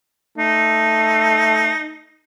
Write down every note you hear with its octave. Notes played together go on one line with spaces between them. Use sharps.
A3 D#4